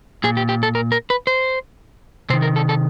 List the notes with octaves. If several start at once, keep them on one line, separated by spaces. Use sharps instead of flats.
A#2 G#4
G4
G4
A4
A#4
A#4
B4
C5
C3 D#3 C5
A#4
A4
A4